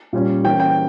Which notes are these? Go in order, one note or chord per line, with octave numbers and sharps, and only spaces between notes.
A#2 G3 C#4
E3 A#3 C#4 G5
G5